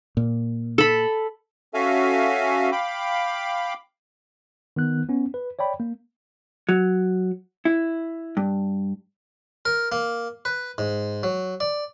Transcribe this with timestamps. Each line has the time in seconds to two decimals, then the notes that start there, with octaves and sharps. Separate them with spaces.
0.17 A#2
0.78 A4 B5
1.74 C#4 F#4 A4 E5 F5 G#5
2.72 F5 G5 B5 D6
4.76 D#3 B3 F#6
5.09 B3 C#4
5.34 B4
5.59 C#5 D5 G5 B5
5.80 A#3
6.69 F#3
7.65 E4
8.37 G2
9.65 A#4
9.92 A#3
10.45 B4
10.78 G#2
11.23 F#3
11.60 D5